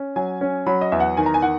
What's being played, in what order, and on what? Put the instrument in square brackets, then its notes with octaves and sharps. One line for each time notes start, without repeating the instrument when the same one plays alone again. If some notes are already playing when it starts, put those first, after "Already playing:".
Already playing: [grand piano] C#4
[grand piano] F#3 [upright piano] G#5
[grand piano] C#4
[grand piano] F#3 [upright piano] B5
[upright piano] D#5
[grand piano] E2 [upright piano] E5
[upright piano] F#5
[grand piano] D#3 [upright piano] G#5
[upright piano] A#5
G#5
[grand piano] D#3 [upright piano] F#5